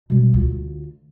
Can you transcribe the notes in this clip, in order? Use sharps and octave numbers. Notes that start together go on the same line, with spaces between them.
B2 G3
D2 F4